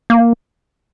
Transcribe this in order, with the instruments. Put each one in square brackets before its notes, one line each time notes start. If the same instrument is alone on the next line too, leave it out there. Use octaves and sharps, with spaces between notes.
[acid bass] A#3